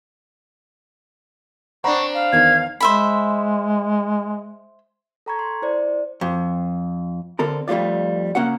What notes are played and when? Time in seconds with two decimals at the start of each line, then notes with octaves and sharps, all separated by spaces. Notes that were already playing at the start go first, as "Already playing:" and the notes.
1.84 C4 D4 F#5 A#5 B5 C#6
2.14 F5
2.32 E2 D#3 G#6
2.80 G#3 C5 E5 B5
5.26 A4 G5 A#5 B5 C#6 G#6
5.39 C6
5.62 E4 C5 D5
6.21 F2
7.39 D3 C4 A4 A#4
7.68 F2 G3 A3 F4 D5
8.35 C#3 A#3 C#4 F#4 F#5